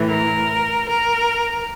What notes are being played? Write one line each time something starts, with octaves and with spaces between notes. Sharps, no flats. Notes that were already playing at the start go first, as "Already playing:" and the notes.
Already playing: A2 E3
A#4
A#4